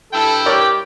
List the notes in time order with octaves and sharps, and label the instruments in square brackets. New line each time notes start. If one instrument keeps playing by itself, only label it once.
[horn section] G2 E4 [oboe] A4 [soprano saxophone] G5
[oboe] G4 [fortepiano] A#4 C#5 D5